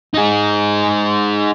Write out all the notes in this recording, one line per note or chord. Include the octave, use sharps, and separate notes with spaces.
D#4 G#4